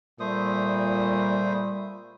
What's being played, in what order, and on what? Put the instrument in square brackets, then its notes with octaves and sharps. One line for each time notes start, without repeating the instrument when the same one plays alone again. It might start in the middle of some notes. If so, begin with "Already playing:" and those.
[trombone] A#2 [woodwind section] G3 [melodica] A3 C5 D#6